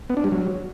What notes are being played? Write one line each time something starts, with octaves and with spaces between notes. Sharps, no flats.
B3
D4
G3
F#3